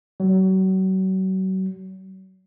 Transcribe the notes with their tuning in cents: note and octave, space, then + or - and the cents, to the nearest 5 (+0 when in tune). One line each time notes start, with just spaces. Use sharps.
F#3 +35